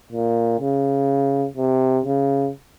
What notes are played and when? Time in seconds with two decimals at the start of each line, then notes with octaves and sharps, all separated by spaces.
0.12 A#2
0.60 C#3
1.57 C3
2.05 C#3